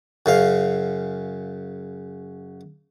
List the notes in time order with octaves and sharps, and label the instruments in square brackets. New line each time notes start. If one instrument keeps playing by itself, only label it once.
[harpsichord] F#2 C#3 F5